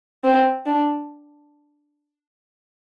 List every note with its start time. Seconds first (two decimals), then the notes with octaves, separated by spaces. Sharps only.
0.24 C4
0.66 D4